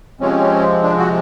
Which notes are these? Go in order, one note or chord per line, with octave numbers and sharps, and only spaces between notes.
C3 F3 G#3 C4 C#4
D4
F#4